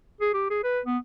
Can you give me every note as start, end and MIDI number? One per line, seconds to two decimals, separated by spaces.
0.21 0.31 68
0.34 0.46 67
0.50 0.62 68
0.64 0.80 71
0.86 0.98 59